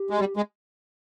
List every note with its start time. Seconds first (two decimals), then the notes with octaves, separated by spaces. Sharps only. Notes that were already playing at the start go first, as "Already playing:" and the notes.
Already playing: G4
0.10 G#3
0.20 G3
0.37 G#3